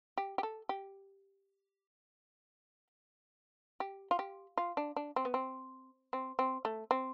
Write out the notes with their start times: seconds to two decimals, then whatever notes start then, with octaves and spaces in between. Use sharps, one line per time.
0.17 G4
0.38 G4
0.43 A4
0.69 G4
3.80 G4
4.11 F4
4.19 G4
4.57 F4
4.77 D4
4.96 D4
5.16 C4
5.25 B3
5.34 C4
6.13 C4
6.39 C4
6.65 A3
6.91 C4